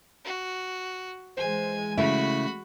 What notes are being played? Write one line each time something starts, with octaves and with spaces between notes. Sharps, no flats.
F#4
E3 G#3 C5 G#5
C#3 A3 E4 F#4 B5